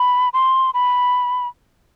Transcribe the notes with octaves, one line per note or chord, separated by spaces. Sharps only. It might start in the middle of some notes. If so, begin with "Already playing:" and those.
Already playing: B5
C6
B5